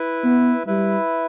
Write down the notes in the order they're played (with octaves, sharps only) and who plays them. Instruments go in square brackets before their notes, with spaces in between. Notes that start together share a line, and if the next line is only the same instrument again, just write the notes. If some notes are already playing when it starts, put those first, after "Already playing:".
Already playing: [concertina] E4 B4 E5
[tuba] B3
[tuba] G3 [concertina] E4 B4 E5